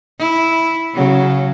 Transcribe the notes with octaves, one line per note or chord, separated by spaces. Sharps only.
E4
C#3 F#3